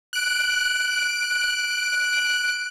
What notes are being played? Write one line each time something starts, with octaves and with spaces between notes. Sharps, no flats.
F#6 D7